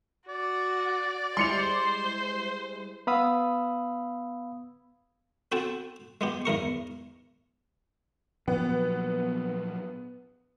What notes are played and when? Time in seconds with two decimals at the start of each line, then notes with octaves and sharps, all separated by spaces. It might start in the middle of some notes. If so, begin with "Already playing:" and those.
0.28 F#4 D5
1.37 G3 G#3 E4 C5 C6 C#7 F7
3.07 B3 F5 B5 D#6 E6
5.52 C4 F#4 A4 G5 A5
6.21 G#3 B3 G4
6.45 E2 G#2 A#4 C#6
8.48 A#2 F3 F#3 B3